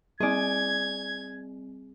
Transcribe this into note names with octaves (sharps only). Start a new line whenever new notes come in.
G3 C4 G#4 D5 G#6